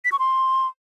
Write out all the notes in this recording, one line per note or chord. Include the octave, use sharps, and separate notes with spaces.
B6
C#6
C6